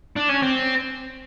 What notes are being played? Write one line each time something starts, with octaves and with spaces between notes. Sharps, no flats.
D4
C#4
C4